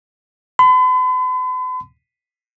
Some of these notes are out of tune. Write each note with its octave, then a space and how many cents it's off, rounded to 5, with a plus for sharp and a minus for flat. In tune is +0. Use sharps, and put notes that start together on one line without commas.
B5 +45